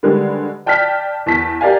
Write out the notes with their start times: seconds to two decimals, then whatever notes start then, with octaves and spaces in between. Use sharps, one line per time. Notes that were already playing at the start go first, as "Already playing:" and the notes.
0.03 D3 D#3 G3 G#3 B4
0.66 D5 G5 A5 F6 F#6 B6
1.26 E2 A5 B6
1.61 G4 A#4 D5 F5 G#5